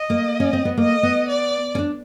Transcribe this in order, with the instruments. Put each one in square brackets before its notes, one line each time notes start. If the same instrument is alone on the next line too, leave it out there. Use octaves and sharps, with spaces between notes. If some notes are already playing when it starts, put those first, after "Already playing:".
Already playing: [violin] D#5
[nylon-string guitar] A#3
C#4
C4
B3
[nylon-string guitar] A#3 [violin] D#5
[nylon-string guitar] B3
[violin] D5
[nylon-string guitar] C#4
D4